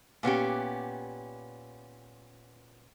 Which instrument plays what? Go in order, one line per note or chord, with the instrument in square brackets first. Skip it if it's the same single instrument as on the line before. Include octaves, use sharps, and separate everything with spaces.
[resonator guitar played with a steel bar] A#2 B3 C#4 G4